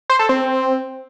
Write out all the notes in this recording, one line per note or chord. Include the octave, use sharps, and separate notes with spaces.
C5
A4
C4